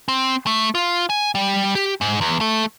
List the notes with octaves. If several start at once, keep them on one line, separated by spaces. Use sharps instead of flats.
C4
A3
F4
G#5
G3
G4
G#2
E2
A3